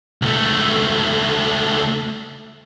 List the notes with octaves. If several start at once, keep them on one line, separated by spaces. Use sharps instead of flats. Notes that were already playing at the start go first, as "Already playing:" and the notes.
C#2 A3